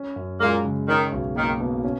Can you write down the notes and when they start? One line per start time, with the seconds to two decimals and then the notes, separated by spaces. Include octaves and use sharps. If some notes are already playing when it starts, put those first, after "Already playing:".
Already playing: C#4
0.16 F#2
0.40 A#2 G#3 A#3
0.64 C#3
0.88 D#3 C#4
1.12 B1
1.36 D#3 A#3
1.60 B2
1.84 C#4